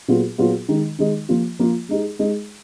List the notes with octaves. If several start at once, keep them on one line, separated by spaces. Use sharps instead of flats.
A#2 F#3 B3 F4 G#4
A#2 F#3 B3 F4 G#4
D#3 G#3 D#4
D#3 G#3 D#4
F3 A#3 F4
F3 A#3 F4
G#3 D#4 G#4
G#3 D#4 G#4